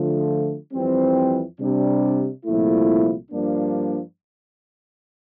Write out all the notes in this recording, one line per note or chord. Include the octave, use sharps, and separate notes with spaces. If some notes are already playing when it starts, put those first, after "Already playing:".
Already playing: D3 F3 A3
F2 E3 G3 C4
C3 G3 D4
C2 A#2 F3 A3 E4
G2 F3 A#3 D4